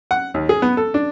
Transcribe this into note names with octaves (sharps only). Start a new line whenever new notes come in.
F#5
D#2
G#4
B3
A4
D4